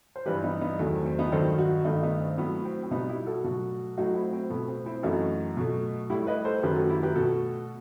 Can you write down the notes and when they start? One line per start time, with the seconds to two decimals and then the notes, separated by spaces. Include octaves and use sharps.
0.16 C5
0.26 G2 E3 G3 G4 B4
0.44 B3 D#4
0.61 B3 D#4
0.79 E2 D#3 F#3 A3
0.93 C4
1.06 C4
1.19 B3 D#4
1.32 G2 D#3 F#3 A4 C5
1.58 D#4 F#4
1.85 G2 D#3 A3 B3 D#4
2.03 B3 D#4
2.21 C4
2.38 A2 F#3 A3 B3
2.65 C4
2.84 C4
2.91 B2 G3 B3 D#4
3.09 E4 G4
3.27 F#4 A4
3.44 B2 F#3 A3 F#4 A4
3.97 A2 F#3 A3 D#4 F#4
4.15 C4 E4
4.33 C4
4.50 B2 A3 B3
4.68 C4
4.86 C4 E4
5.03 F#2 E3 A3 D#4 F#4
5.57 B2 F#3 A3
6.10 A2 G3 E4 G4
6.27 B4 D#5
6.45 A4 C5
6.63 F#2 D#3 F#3 A3 G4 B4
6.76 F#4 A4
6.89 E4 G4
7.03 G4 B4
7.16 B2 A3 F#4 A4